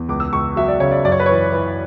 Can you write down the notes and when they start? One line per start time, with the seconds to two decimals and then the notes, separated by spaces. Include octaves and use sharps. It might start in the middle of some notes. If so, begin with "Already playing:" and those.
Already playing: E2
0.08 C#2 D6
0.20 E6
0.33 C#2 C#6
0.56 F#3 E5
0.68 D5
0.80 C#3 C#5
0.91 D5
1.05 F#2 D5
1.12 C#5
1.20 B4
1.26 E3 C#5
1.52 E3